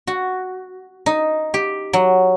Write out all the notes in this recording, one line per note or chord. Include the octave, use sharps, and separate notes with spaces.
F#4
D#4
G4
F#3